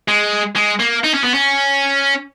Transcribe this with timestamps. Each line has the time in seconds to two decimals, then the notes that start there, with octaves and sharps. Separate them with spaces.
0.08 G#3
0.55 G#3
0.79 A#3
1.04 D#4
1.14 C#4
1.24 B3
1.34 C#4